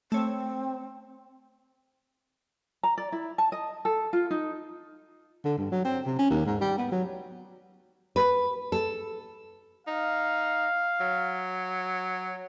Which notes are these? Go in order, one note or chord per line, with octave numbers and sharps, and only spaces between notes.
A3 C4 C#5
A#5
D5
E4
A5
D#5
A4
F4
D#4
D3
G2
F#3
C4
C3
C#4
D#2
G#2
G3
B3
F#3
B4
A4
D#4 F5
F#3